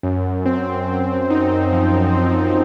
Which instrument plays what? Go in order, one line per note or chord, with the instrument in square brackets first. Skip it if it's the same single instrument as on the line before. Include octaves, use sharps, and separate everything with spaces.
[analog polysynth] F#2
C4
F#2
D#4
F3
C4